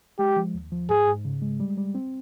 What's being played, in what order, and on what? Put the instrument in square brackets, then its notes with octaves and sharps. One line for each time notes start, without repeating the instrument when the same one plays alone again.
[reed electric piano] G#3 [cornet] G4
[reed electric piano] F3
D#2
F3
[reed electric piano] G#2 [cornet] G#4
[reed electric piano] G#2
C#3
G#3
G3
G3
C4